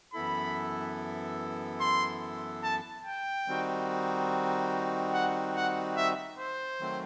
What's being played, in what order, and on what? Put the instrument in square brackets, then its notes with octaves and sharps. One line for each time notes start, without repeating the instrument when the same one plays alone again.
[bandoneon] F#2 E3 B3 E4 A4 [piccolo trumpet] B5
[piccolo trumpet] C6
A5
G5
[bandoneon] D#3 G3 C4 D#4 F#4
[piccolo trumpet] F#5
F#5
E5
C5
[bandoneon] D#3 F#3 A3 C4